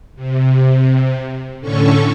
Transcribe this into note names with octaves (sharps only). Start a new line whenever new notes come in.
C3
A2 D3 C#4 A4 C#6